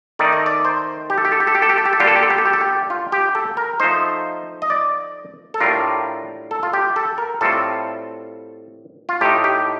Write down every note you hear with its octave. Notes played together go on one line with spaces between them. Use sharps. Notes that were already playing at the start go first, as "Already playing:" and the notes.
D#3 A3 D#4 D5
D#5
D5
C5
G4
A4
G4
A4
G4
A4
G4
A4
G4
A4
G4
A4
D3 G3 A#3 D4 F4 G4
A4
G4
A4
G4
A4
G4
A4
G4
F4
G4
A4
A#4
F3 A3 D#4 C5
D#5
D5
A4
A2 G3 D4 F4 A#4
A4
F4
G4
A4
A#4
A2 G3 C4 F4 A4
F4
A2 A3 D#4 G4
G4